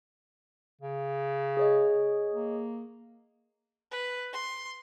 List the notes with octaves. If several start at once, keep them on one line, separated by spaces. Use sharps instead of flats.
C#3
G#4 C#5 D#5
A#3
B4
C6